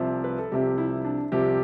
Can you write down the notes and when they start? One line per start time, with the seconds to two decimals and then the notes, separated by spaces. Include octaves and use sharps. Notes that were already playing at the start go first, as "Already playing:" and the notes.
Already playing: C2 C3 F3
0.24 B4
0.39 A4
0.52 C2 C3 F3 G4
0.78 E4
1.05 D4
1.32 C2 C3 F3 G4